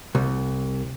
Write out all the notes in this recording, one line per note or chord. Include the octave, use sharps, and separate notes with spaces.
C2